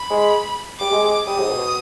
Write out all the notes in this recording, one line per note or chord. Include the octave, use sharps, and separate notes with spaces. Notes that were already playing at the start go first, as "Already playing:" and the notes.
Already playing: B5
G#3
G3 D6
G#3
G#3
G3 D#6
G#2
B2